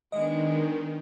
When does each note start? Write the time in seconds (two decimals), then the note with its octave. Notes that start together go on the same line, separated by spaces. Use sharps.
0.12 D#3 G#3 B3 D4 D#5